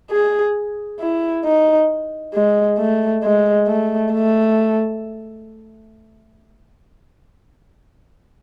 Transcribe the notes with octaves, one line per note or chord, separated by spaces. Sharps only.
G#4
E4
D#4
G#3
A3
G#3
A3
A3